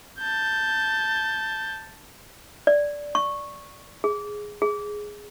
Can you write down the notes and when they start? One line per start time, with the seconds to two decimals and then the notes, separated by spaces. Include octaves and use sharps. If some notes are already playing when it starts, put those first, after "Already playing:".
0.19 A5 G6
2.67 D5
3.15 C#6
4.04 G#4
4.62 G#4